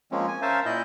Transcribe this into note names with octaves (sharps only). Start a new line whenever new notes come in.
F3 G#3 A#3 C4 C#4
G#5
C#4 A#4 C5 E5 F5 A5
A#2 E4 D#5 G6